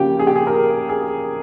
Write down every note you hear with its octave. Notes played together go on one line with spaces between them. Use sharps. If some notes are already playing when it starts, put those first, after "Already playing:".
Already playing: C#3 F3 A#3 C#4 G4
G#4
G4
G#4
A#4
G#4